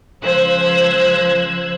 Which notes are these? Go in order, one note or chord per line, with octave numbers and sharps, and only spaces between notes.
C#2 F3 C5 E6 F#6 G#6